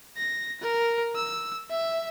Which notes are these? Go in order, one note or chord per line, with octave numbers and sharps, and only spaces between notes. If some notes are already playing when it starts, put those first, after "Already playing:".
A#6
A#4
E6
E5